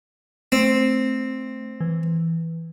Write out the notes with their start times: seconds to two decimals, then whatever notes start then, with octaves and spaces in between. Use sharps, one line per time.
0.52 A3 C4
1.81 E3